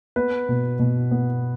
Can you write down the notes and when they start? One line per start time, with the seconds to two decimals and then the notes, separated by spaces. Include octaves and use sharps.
0.16 B3 B4
0.49 B2
0.79 B2
1.11 B3